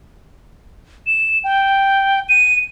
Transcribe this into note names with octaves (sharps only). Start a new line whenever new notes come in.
E7
G5
D#7